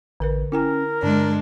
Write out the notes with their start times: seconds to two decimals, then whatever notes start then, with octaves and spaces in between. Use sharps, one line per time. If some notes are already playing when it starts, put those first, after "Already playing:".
0.20 A1 D3 A#4 B4
0.52 C#4 E4 A#4 G5 G#5
1.03 G2 D3 G#3 D4